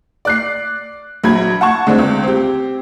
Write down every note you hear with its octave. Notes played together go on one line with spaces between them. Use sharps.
D5 F#6 C7
A#1 F#3 B5 G#6
F#5 A5 C#6
D3 G#3 A3 C4 D4
C#2
C4 G4